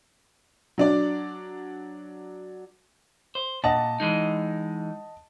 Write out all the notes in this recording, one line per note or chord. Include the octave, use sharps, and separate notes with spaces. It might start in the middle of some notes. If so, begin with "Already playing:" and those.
F#3 D4 D5
C5
A#2 D#5 F#5 A5
E3 G#3 D#4